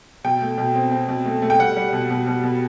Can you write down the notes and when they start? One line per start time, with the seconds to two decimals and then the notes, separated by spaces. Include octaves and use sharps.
0.24 B2 G5
0.42 A3
0.58 B2
0.75 C4
0.92 C4
1.08 B2
1.25 A3
1.42 A3
1.50 G5
1.59 G3 F#5
1.76 G3
1.93 B2
2.10 B2
2.27 B2
2.43 B2